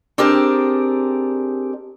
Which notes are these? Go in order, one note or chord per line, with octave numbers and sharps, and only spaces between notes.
C4 D4 G4 G#4 A#4 D5